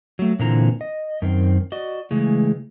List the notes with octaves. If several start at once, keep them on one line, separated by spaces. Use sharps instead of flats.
F#3 A3
A#2 D3 E3 C4 A#5
D#5
F#2 D#3 C4
F#4 D5 D#5
C#3 E3 G#3 A3